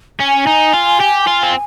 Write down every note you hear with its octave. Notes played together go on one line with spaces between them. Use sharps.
C#4 G#5
D#4
F4
G4
F4
C4